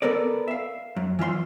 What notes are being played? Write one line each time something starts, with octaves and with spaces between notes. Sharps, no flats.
B3 A4 A#4 D5
E5 F5
F#2
E3 F4 E5 C6